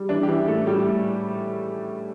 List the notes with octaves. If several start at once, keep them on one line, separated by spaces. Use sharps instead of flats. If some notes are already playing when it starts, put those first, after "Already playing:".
Already playing: G3
E3 D4
G4
E3 E4
A2 A3 A4
A2 G3 G4
A2